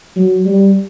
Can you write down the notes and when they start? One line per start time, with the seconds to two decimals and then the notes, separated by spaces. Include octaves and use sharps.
0.16 F#3
0.46 G3